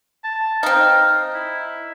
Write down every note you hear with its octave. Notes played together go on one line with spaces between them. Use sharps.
A5
C4 D#4 F5
E4